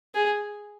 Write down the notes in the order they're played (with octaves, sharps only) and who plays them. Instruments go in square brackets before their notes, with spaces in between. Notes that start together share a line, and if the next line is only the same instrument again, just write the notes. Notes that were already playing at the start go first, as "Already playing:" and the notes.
[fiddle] G#4